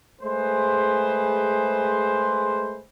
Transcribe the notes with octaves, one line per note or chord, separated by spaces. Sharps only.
G#3 A3 G#4 B4 C5